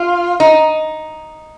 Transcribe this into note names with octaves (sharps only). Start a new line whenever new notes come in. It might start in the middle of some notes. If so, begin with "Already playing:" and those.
Already playing: F4
D#4